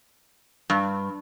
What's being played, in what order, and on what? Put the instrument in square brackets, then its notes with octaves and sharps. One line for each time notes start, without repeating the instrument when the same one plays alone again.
[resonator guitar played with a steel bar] G2